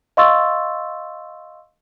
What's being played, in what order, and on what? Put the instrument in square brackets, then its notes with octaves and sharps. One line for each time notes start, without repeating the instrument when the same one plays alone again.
[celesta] D#5 F5 C6 C#6 E6 A6